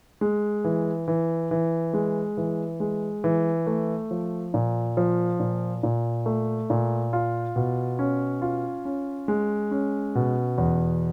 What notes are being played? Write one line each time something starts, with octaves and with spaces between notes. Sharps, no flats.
G#3
E3
E3
E3
G#3
E3
G#3
E3
A3
F3
A#2
F3
A#2
A#2
A3
A#2
F4
B2
C#4
F4
C#4
G#3
C#4
B2
E2